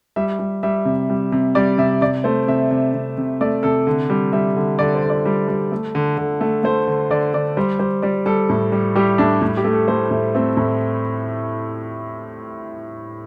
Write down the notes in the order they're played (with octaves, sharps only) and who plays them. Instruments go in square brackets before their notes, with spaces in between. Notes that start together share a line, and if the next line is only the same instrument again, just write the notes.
[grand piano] G3 E5
G3
G3 E5
C3
G3
C3
G3 D5
C3 E5
C3 D5
A3 C5
C3 E5
C3
C3
C3
A3 D5
C3 A4
D3
G3
G3 E5
D3
D3 D5
C5
D3
D5
G3
G3
A3
D3
D3
A3
A3 C5
D3
D3 D5
D3 D5
G3 C5
G3 C5
G3 D5
G3 A4
A2
G3
G3 G4
A2 D4
A2
G4
A3
A4
A3 C5
A2
A3 C4
A2